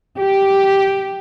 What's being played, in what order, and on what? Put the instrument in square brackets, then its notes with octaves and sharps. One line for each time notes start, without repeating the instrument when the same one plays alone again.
[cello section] G4